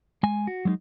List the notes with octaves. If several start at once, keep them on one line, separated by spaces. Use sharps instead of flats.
G#3 G#5
F#4
F#3 G#3 C#4 D#4